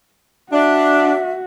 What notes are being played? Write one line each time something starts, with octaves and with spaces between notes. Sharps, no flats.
D4 F#4 E5